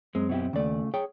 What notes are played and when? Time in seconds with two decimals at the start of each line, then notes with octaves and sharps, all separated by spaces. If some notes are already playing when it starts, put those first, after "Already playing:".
0.15 F#2 G#3 C4
0.29 B2 E4 G4
0.53 D#2 C#3 A3 D5
0.94 G#4 C#5 G5